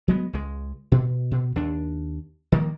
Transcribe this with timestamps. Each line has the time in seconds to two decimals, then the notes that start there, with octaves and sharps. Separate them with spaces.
0.08 F#3 G#3 B3
0.33 C#2 G#3
0.92 B2
1.31 B2
1.56 D#2 D4
2.52 D#3 F3 A#3